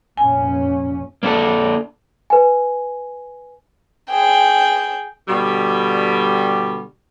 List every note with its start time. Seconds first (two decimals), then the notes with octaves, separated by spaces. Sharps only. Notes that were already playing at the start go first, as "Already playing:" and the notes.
0.17 F1 A#2 C#4 G#5
1.23 A#3 D4 A4
2.30 B4 G#5
4.11 G#4 G5
5.27 B2 D3 G3